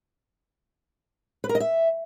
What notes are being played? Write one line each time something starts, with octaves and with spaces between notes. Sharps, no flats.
B4
A#4
D#5
E5